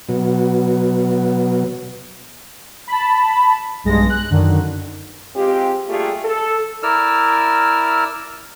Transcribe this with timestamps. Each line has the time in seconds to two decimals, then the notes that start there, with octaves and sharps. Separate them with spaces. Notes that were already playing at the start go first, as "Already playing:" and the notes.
0.09 B2 F#3
2.87 A5 B5
3.84 B1 G2 G#3 A#6
4.09 F#6
4.30 F#2 D3 D#3
5.36 G#3 C4 F4 G4
5.88 G3 A3 A#3 F4 G4 G#4
6.24 A4
6.83 E4 A#4 D5 E6 F6